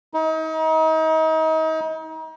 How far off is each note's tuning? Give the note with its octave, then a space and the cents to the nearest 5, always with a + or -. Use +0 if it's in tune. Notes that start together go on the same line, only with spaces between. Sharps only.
D#4 +35